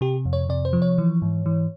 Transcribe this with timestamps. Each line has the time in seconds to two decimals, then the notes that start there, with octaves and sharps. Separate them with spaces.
0.01 C3 G4
0.25 F2
0.33 C#5
0.49 C3 D5
0.65 C5
0.73 F3
0.82 C#5
0.98 E3
1.22 G#2
1.46 E3